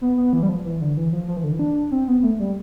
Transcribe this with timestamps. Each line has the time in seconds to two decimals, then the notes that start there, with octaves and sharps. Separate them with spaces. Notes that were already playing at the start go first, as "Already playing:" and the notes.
0.01 B3
0.17 B3
0.33 E3
0.43 G3
0.49 F3
0.65 E3
0.81 D3
0.97 E3
1.13 F3
1.28 F3
1.37 E3
1.44 D3
1.52 E3
1.59 D4
1.91 C4
2.08 B3
2.23 A3
2.40 G3